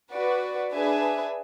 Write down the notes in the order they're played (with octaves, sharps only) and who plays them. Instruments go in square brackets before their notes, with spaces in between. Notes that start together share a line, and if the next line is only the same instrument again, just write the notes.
[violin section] F#4 B4 D5
D4 G#4 B4 E5 G#5